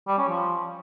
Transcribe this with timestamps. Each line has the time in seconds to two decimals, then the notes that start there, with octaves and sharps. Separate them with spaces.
0.07 G3
0.18 C#4
0.28 F3